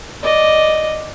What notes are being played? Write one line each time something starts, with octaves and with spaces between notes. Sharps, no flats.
D5 D#5